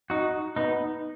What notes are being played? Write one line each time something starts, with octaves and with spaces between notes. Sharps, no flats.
D#4 F#4
B3 D#4